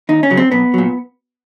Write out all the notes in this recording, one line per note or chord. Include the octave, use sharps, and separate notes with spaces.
D#2 D#4
C#4
C#3 F#3
C4
B1 B3
A#2 F#3